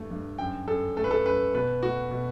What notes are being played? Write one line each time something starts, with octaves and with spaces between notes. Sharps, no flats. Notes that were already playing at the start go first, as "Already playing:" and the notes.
Already playing: G2 A3
G2
F#2 G5
F#2 A4
A3 A4
B4
A4
F#2 B4
B2 B4
A3 F#4
B2